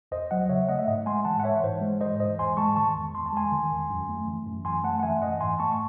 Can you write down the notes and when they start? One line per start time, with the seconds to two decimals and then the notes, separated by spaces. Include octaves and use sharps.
0.12 E2 C5 D#5
0.31 F#3 D#5 F#5
0.49 C#3 C#5 E5
0.68 A3 D#5 F#5
0.79 E5
0.87 G#2 D#5 F#5
1.06 G#3 G#5 C6
1.25 E3 F#5 A5
1.40 F#5
1.44 G#2 C#5 E5
1.64 G#2 C5
1.82 G#3
2.01 E3 C5 D#5
2.19 G#2 C5 D#5
2.39 E2 G#5 C6
2.57 G#3 A5 C#6
2.76 D#3 A5 C#6
2.95 E2
3.15 E2 C6
3.26 A5
3.33 G#3 G#5 C6
3.52 D#3
3.71 E2
3.90 F#2
4.09 A3
4.27 E3
4.46 F#2
4.65 F#2 G#5 C6
4.84 A3 F#5 A5
4.99 F#5
5.03 E3 E5 G#5
5.22 F#2 D#5 F#5
5.40 G#2 G#5 C6
5.59 A3 A5 C#6
5.72 C#6